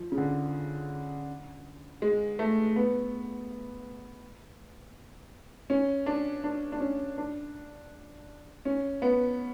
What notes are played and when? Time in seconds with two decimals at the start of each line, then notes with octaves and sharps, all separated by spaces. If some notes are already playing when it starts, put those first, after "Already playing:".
Already playing: F3
0.12 C#3
0.17 D3
2.02 G#3
2.39 A3
2.76 B3
5.70 C#4
6.06 D4
6.44 D4
6.72 D4
6.80 C#4
7.18 D4
8.65 C#4
9.02 B3